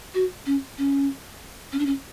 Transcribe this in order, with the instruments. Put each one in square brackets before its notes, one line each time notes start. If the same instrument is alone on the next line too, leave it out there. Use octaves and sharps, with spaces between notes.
[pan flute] F#4
C#4
C#4
C#4
D4
C#4